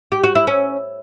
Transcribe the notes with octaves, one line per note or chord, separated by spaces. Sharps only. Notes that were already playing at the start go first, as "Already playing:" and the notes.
G4
F#4
E4
C#4